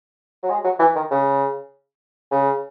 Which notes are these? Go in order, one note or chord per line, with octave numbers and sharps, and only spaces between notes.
F#3
G#3
F#3
E3
D#3
C#3
C#3